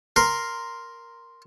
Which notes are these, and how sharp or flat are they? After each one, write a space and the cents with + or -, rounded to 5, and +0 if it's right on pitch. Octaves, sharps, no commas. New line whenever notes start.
A#4 +0 C6 +0